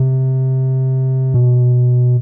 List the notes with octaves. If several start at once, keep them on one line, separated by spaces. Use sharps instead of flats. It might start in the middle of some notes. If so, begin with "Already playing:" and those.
Already playing: C3
B2